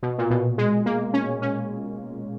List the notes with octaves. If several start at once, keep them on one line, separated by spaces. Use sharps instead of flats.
B2
A#2
B2
G#3
A#3
C#4
C#4